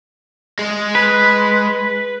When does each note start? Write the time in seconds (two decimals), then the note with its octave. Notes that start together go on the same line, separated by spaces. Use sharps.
0.59 G#3
0.95 B4